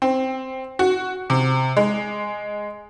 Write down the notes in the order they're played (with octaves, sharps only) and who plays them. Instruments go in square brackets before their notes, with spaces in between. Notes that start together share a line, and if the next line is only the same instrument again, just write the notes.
[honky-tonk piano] C4
F#4
C3
G#3